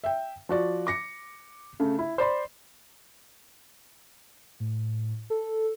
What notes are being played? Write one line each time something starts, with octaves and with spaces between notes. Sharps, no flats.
E5 G5
F3 F#4 D5
D6 A#6 C#7
C#3 A3
E4
C5 D5 B5 C6
A2
A4